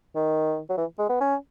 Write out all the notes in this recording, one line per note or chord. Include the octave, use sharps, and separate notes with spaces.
D#3
F#3
E3
G#3
B3
C#4